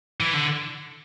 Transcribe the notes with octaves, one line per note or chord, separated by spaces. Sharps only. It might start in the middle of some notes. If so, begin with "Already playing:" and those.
E3
D3